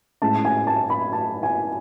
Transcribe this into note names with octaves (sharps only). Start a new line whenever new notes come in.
A2 G#3 C#4 A5
G#5
A5
B5
A5
G#5